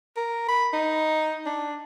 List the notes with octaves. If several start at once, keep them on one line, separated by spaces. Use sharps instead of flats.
A#4
B5
D#4
D4